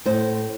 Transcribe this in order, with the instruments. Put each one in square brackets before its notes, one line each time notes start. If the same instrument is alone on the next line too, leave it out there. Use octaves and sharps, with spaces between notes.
[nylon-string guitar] A2 C5